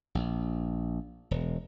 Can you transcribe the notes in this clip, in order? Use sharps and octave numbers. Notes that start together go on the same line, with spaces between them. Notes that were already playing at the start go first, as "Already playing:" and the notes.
A#1
E1